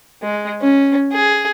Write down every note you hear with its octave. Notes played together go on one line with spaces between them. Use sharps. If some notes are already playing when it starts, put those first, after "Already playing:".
G#3
C#4
G#4